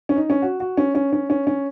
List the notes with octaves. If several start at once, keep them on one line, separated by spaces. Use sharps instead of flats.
C#4
D#4
C#4
F#4
F#4
C#4
C#4
C#4
C#4
C#4